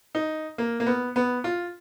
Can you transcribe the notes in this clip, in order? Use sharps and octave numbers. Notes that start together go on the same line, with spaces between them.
D#4
A#3
A#3
B3
B3
F4